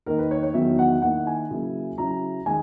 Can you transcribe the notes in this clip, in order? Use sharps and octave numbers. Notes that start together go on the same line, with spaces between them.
D#3 A#3 D#4 A#4
B4
C#5
C#5
E2 D#3 F#3 B3 E5
F#5
D#3 A#3 E4 F#5
G#5
C#3 F#3 A#3 E4
C#3 F#3 C#4 E4 A#5
D#3 G#3 G#5